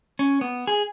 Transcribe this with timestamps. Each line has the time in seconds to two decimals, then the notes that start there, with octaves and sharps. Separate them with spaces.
0.19 C#4
0.41 B3
0.67 G#4